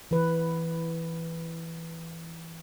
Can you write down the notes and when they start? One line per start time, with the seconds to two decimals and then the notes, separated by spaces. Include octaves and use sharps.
0.11 E3 B4